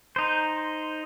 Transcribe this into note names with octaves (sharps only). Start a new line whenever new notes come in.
D#4 C5